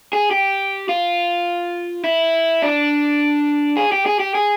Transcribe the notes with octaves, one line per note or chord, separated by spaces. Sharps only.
G#4
G4
F4
E4
D4
G#4
G4
G#4
G4
G#4